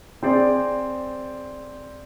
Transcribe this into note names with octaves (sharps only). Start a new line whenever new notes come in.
C4 G#4 C5 D5